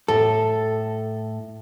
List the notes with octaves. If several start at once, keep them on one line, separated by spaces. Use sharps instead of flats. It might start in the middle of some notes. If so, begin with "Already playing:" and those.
A2 A4